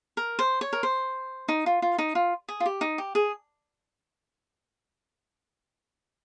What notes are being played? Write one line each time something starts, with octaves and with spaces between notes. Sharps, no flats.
A#4
C5
C#5
A#4
C5
D#4
F4
F4
D#4
F4
G#4
F4
G4
D#4
G4
G#4